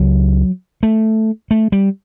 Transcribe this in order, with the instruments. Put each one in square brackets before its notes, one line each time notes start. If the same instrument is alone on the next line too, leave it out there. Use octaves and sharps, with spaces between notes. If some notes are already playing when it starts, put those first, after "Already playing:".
Already playing: [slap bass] C#2 C#3 F#3
A3
A3
G3